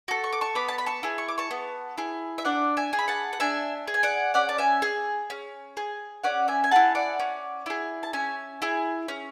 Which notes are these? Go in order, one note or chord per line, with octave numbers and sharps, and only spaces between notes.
F#4 A4
C#6
D6
A5 C#6
B3 B5 D6
A5
B5
A5 C#6
E4 G#4
C#6
D6
A5 C#6
B3
E4 G#4
E5
D4 D5 F#5
E5 G#5
G#4
B5
F#5 A5
F#5
D4 E5 G#5
G#4
G#5
D5 F#5
C#4 D5 F#5
A5
E5 G#5
G#4
C#4
G#4
C#4 D5 F#5
E5 G#5
G#5
E4 G#4 F#5 A5
D5 F#5
C#4
E4 G#4
A5
C#4 E5 G#5
E4 G#4
C#4